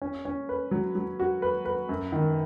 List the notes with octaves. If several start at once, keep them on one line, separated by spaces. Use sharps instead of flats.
C#4
C#4
B4
F#3
F#3
F#4
B4
B4
F#2
D#3